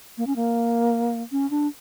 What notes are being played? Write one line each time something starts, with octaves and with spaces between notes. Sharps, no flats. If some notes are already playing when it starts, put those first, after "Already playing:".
A#3
C#4
A#3
C#4
D4